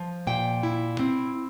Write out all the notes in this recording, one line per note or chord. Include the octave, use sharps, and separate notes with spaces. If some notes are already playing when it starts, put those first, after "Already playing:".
Already playing: F3
A#2 G5
E4
C4